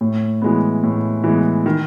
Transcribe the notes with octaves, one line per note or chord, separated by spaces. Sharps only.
A2
E3 G#3 B3
A2
E3 G#3 B3
D#3